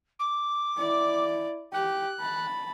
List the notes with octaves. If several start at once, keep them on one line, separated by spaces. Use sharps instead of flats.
D6
E4 D5
G4 F#6
A5 B5